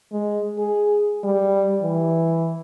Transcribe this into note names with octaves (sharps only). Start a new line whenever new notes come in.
G#3
G#4
G3
E3